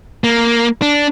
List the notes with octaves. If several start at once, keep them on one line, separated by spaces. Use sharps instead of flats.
A#3
D4